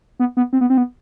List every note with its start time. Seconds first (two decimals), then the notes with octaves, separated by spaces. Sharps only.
0.19 B3
0.37 B3
0.53 C4
0.61 B3
0.70 C4
0.78 B3